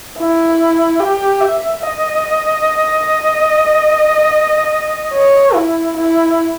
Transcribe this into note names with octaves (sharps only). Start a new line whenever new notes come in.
E4
G4
E5
D#5
C#5
E4
E4